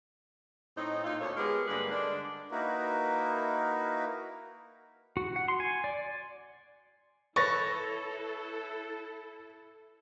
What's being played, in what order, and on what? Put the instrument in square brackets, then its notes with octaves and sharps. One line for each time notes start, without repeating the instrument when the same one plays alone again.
[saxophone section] A2 C4 D#4
A#2 D#4 F4
D2 A#2 A4 C#5
G#3 B3 G4 G#4 A#4
G2 D3 G#3 A#3 B4
D3 G#3 D4
[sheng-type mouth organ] A#3 D#4 E4 F#4 A#4 B4
[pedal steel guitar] F#4
F#5
C6
G#5
D5
[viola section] E4 A4 [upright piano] B4 [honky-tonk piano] C#5 A6 A#6 [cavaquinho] C#6